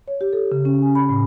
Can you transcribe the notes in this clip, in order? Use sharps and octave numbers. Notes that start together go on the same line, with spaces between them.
C#5
G4
A4
C#3
C#4
G#5
B5
A2